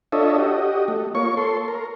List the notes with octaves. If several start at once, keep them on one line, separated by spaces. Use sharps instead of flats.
D4 F4 A4 C#5 D#5 E5
F#4 G4 D#5
A3
A#3 F4 C#5 C#6
A4 C6
A#4